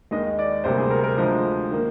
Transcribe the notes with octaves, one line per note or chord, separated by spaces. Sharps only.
D#2 D#3 G#3 D#5
D5
D2 C3 G3 A#3 C5
G#4
A#4
A#4
D2 D3 F3 G#3 C5
D#3 A#3